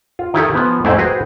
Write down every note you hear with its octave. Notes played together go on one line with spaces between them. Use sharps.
F4
D#3 E4 G4 A4
F3 B3 G#5
F2 G#2 A3 C4 E4
F#4 G#4 B4 C5 F#5 G5